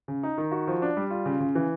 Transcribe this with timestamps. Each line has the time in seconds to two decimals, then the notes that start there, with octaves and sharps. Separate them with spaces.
0.08 C#3
0.23 D#4
0.38 D#3
0.52 F#4
0.68 F3
0.82 D4
0.97 G3
1.10 F4
1.26 C#3
1.40 C#3
1.55 E3